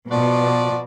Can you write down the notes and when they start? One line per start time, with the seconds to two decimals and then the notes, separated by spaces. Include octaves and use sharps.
0.11 B2 F3 F#4 D5